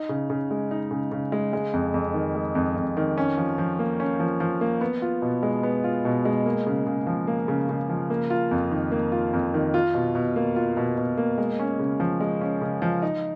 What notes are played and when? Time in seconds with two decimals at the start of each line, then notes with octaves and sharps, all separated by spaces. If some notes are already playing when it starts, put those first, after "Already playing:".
Already playing: D#4
0.09 C#3
0.30 C#3
0.51 G#3
0.71 D#4
0.91 C#3
1.12 C#3
1.32 G#3
1.53 G#3
1.73 F2
1.94 F2
2.14 D#3
2.35 G#3
2.55 F2
2.76 F2
2.97 D#3
3.18 C#4
3.37 F3
3.58 F3
3.79 A#3
4.00 C#4
4.20 F3
4.40 F3
4.61 A#3
4.81 B3
5.02 F4
5.22 B2
5.43 G#3
5.63 B3
5.84 F4
6.05 B2
6.25 G#3
6.46 A#3
6.67 C#3
6.86 C#3
7.07 F3
7.27 A#3
7.48 C#3
7.69 C#3
7.89 F3
8.10 A#3
8.30 F4
8.51 F2
8.71 D#3
8.92 A#3
9.12 F4
9.33 F2
9.54 D#3
9.74 F4
9.94 B2
10.15 B2
10.36 A#3
10.56 F4
10.77 B2
10.98 B2
11.17 A#3
11.38 G#3
11.59 C#4
11.80 C#3
12.00 F3
12.20 G#3
12.41 C#4
12.61 C#3
12.82 F3
13.02 D#4